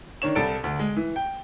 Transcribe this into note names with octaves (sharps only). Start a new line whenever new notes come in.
D#3 D4 C#5 E7
C2 A4 D7
D2
G#3
E3
G5